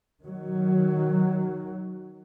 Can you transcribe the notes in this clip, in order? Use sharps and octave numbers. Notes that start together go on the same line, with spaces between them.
D#3 F#3